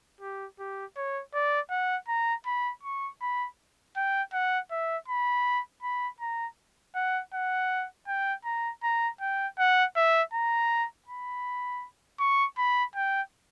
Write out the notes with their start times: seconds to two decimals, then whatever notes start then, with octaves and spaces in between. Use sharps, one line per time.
0.21 G4
0.59 G4
0.97 C#5
1.34 D5
1.71 F#5
2.08 A#5
2.46 B5
2.83 C#6
3.22 B5
3.97 G5
4.33 F#5
4.71 E5
5.08 B5
5.83 B5
6.21 A#5
6.96 F#5
7.34 F#5
8.08 G5
8.45 A#5
8.83 A#5
9.21 G5
9.59 F#5
9.96 E5
10.34 A#5
11.08 B5
12.20 C#6
12.58 B5
12.96 G5